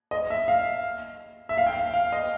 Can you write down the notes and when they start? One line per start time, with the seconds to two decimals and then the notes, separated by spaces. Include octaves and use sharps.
0.11 D#5
0.30 E5
0.48 F5
1.49 E5
1.58 F5
1.67 G5
1.76 F5
1.94 F5
2.12 D#5